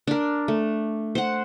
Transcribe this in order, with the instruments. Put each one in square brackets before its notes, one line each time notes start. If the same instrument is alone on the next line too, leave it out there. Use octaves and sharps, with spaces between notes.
[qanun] D4 A#4
A3
C5 F#5